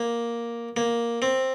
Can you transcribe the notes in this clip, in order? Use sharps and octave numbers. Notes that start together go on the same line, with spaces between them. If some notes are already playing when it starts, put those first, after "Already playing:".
Already playing: A#3
A#3
C4